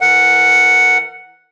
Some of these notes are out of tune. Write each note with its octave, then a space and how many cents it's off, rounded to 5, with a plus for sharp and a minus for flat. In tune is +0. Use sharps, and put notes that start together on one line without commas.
E3 +0 A#4 -30 F#5 +0